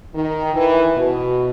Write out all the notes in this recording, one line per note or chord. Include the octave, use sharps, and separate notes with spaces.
D#3
E3
B2